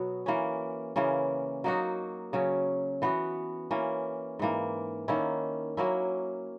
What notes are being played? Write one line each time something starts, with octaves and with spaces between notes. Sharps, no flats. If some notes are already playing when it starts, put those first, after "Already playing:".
Already playing: B2 F#3 B3 F#4
E3 A#3 C#4
C#3 E3 A#3 C#4
F#3 A#3 D#4 F#4
C#3 F#3 C#4
E3 B3 F#4
E3 A#3 C#4
G#2 E3 A#3
D#3 A#3 C#4 E4
F#3 A#3 C#4 E4